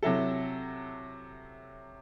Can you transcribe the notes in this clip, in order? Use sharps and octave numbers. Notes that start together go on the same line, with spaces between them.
C3 F#3 E4 A4